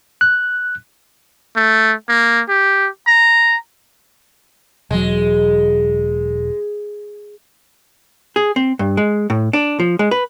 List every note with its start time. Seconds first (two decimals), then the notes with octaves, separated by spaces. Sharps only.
0.21 F#6
1.56 A3
2.09 A#3
2.49 G4
3.07 A#5
4.91 E1 F#3 G#3
8.36 G#4
8.56 C4
8.79 G2
8.97 G#3
9.30 A2
9.53 D4
9.80 F3
9.99 G#3
10.11 B4